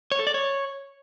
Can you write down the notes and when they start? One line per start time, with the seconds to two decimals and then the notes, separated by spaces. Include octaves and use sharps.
0.12 C#5
0.19 A4
0.27 D5
0.34 C#5